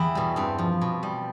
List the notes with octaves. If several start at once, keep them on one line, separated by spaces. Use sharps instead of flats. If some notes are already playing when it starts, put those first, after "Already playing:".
Already playing: E2 E4 G4
B2 G3
G2 C4
F3
B2
G3